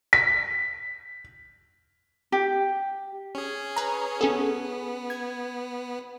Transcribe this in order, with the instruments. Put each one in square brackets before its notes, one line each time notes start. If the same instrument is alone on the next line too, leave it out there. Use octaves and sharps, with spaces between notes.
[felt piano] B6
[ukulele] G4
[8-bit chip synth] C#4 G#4
[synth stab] B4 A#5
[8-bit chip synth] B3 [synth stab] C#4 G#4 A4
[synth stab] G#6